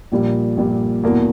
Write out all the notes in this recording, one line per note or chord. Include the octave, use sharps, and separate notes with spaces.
A#1 A#2 G3
A#1 A#2 G3
E2 B2 A#3